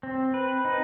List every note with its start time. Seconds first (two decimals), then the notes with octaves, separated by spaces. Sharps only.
0.03 C4
0.34 B4
0.65 D#4